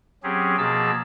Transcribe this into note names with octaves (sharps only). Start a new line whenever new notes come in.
F#3 C4 C#4 G4 G#4
B2 F3 A#3 G#4 A5 E6